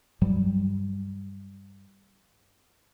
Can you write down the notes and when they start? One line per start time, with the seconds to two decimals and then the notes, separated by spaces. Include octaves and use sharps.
0.22 G2 F#3 G3